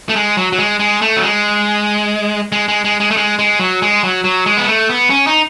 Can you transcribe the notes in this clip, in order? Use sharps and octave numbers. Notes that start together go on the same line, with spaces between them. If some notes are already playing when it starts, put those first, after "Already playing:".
A3
G#3
F#3
F#3
G#3
G#3
A3
F#3
G#3
G#3
G#3
G#3
G#3
A3
G#3
G#3
F#3
G#3
F#3
F#3
G#3
B3
A3
B3
C#4
D#4